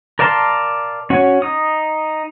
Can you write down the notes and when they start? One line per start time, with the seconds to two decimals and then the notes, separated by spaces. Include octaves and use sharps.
0.19 A#4 D5 F5 A5 C6
1.10 C#4 F#4 C#5
1.42 D#4 D#6